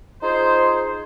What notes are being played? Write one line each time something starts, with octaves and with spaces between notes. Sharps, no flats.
D#4 F4 G#4 C5